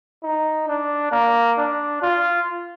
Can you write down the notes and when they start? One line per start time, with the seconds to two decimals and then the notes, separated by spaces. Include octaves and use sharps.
0.23 D#4
0.68 D4
1.12 A#3
1.57 D4
2.02 F4